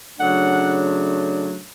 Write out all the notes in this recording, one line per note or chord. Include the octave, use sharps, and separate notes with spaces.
C#3 F#3 A3 D4 F#5